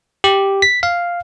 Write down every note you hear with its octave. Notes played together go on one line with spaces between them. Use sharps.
G4
B6
F5